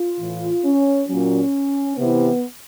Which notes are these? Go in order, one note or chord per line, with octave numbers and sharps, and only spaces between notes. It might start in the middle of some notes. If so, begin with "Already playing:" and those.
Already playing: F4
A2 E3
C#4
A#2 F#3 C#4
C3 E3 B3